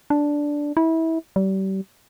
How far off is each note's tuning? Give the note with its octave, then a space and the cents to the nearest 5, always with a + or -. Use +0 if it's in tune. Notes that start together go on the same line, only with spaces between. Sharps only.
D4 -5
E4 -25
G3 -35